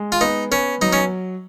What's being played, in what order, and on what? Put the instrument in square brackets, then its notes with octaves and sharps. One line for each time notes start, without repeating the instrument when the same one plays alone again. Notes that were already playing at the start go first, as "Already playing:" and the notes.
Already playing: [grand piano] G#3
[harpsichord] F4
[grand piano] B3 [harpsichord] D#4
[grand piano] B3 [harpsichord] C#4
[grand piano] F#3 [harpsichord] D#4
[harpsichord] C#4